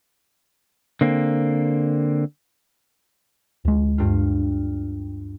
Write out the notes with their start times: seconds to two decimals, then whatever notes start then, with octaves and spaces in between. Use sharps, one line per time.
1.01 D3 A#3 C4
3.65 D2 G#3
3.98 G2 F4